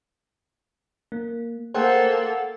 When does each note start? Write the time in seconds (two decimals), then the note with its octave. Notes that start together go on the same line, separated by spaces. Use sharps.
1.12 A#3
1.74 A#3 A4 C5 F#5 G5